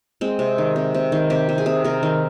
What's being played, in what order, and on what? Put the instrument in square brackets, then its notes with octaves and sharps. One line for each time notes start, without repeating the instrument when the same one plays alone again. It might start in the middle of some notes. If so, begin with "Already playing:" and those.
[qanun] G#3 C4
C3
D#3
C3
C3
D#3
C3 G4
C3
G#4
C3
C3 A#4
D#3